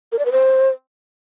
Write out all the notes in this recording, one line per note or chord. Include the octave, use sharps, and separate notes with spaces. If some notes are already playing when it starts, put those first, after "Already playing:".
A#4
D5
B4
C5